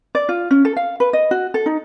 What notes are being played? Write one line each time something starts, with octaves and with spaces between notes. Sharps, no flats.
D5
F4
C#4
A4
F5
B4
D#5
F#4
A4
D#4